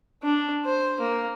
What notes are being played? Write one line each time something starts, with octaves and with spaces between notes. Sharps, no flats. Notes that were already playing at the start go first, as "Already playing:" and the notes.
D4
C5
A#3